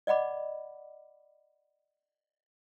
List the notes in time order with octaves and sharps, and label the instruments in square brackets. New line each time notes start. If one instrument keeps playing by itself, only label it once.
[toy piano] D5 D#5 F#5 B5 D6